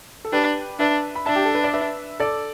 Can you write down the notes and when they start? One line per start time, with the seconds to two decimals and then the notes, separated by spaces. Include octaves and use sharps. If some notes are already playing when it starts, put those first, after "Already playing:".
0.25 A4
0.32 D4 G4 B4
0.79 D4 B4 E5
1.15 B5
1.26 D4 E5 A5
1.36 G4
1.45 A4
1.55 B4
1.64 D5
1.73 B4 E5
2.20 A4 D5